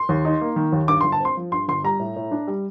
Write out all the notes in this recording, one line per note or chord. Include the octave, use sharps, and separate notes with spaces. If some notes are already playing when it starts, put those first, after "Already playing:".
Already playing: C6
D#2
D#4
A#3
D#3
D#2
G2 D6
C6
G1
A5
C4 C6
F3
G2 C6
G1 C6
G3 A#5
A2
A2
D4
G3